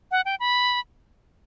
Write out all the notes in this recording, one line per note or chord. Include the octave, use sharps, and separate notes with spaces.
F#5
G5
B5